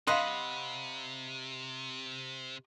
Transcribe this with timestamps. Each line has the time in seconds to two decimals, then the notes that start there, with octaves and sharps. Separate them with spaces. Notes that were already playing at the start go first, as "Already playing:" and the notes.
0.07 C3 D#5 F5 F#5 B5 C6